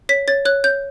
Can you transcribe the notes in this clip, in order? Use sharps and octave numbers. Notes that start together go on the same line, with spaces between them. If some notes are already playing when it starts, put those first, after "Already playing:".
C#5 B6
C#5 A6
C#5 F#6
C#5 G6